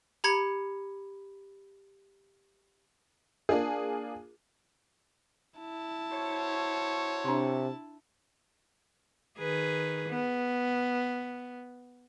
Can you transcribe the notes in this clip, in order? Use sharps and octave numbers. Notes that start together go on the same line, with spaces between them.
G4 A#5 B5 G#6 C#7
A#3 D4 F4 G#4
E4 A5
F#4 C5 C#5
C3 D4 C6
D#3 G#4 B4
B3